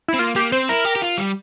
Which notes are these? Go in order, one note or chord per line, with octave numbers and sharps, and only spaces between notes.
E4
C4
A#3 F4
A#3 G4
C4 C5
E4 A#4
G4
G4
F4
G3